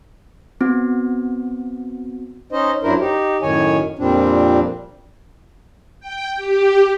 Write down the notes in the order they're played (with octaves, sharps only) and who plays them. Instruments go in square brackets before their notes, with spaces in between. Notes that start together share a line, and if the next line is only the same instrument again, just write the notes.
[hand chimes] B3 C4 F#4
[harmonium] C#4 D#4 C5 D#5
F#2 F#3 D4 E4 A#4 C5
D#4 G4
F#2 A2 D#3 C#5 G#5
F2 A#2 G3 C4 D4
[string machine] G5
G4